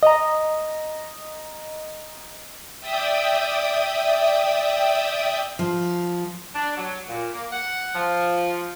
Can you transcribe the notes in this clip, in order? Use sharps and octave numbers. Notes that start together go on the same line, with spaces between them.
D#5 A#5
D5 E5 G5 D#6
F3
D4
F#3
A#2
A#3
F#5
F3